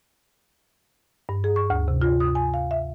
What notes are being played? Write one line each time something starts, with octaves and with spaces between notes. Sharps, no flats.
G2
G#4
C#6
D2
C3
F4
D#6
G#5
F5
E5